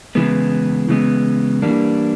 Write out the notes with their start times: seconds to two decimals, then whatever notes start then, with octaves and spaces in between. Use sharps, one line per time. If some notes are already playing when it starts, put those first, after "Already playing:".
0.15 C#3 E3 G#3 B3
0.88 C#3 E3 G#3 B3
1.62 E3 G3 A#3 D4